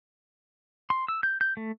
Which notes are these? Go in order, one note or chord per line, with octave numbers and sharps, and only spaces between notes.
C6
E6
G6
G6
A3